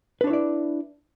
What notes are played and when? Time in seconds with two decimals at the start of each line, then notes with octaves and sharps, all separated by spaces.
0.21 B4
0.24 D4
0.27 C#5
0.30 E4
0.33 D5